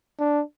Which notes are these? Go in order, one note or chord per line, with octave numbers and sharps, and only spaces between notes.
D4